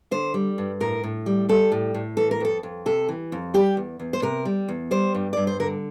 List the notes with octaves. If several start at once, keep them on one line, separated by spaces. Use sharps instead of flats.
D3 C5
G3
G2
A2 A#4
A2
G3
G3 A4
A2
A2
E3 A4
A#4
F2 A4
F2
C3 A4
E3
F2
G3 G4
E2
E2
C5
C3 A#4
G3
E2
G3 C5
G2
G2 D5
C5
D3 A#4